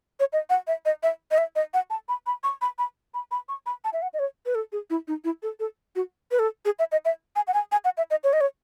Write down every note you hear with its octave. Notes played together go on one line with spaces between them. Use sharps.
C#5
D#5
F#5
E5
D#5
E5
D#5
E5
D#5
F#5
A5
B5
B5
C#6
B5
B5
B5
B5
C#6
B5
A5
E5
F#5
D#5
C#5
B4
A4
G#4
E4
D#4
E4
A4
A4
F#4
B4
A4
G#4
E5
D#5
E5
G#5
F#5
G#5
G#5
F#5
E5
D#5
C#5
D#5
C#5